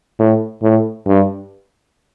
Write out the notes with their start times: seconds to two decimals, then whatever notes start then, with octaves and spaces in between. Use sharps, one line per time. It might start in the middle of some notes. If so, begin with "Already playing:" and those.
0.19 A2
0.63 A2
1.07 G2